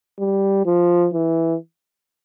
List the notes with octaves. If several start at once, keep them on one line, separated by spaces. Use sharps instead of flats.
G3
F3
E3